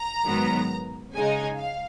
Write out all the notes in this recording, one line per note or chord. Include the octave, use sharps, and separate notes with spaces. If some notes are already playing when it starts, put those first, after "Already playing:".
Already playing: A#5
G#2 D#3 F#3 B3
C#3 G#3 D#4 G#5
F5